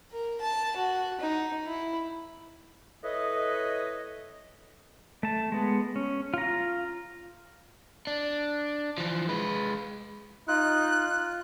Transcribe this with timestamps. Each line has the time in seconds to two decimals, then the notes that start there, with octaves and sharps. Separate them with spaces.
0.11 A#4
0.41 A5
0.76 F#4
1.21 D#4
1.67 E4
3.03 E4 A4 B4 C#5 D#5
5.23 A3 A5
5.52 G#3 B3
5.96 C#4
6.34 F4 A#5
8.07 D4
8.98 E3 F3
9.29 G#3 B4
10.48 D#4 F4 F#6